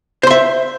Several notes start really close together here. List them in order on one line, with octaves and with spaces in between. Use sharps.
C5 C6 E5